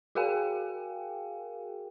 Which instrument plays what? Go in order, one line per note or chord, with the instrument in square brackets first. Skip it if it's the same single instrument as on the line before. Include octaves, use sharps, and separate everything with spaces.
[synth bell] F#4 G#4 A#4 F5 G5 G#5